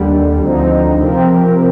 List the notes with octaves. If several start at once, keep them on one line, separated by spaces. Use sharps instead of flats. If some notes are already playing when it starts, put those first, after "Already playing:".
Already playing: D#2 D3 G3
D2 D3 F3 C4 D#4
C3 F3 C4 G4 A#4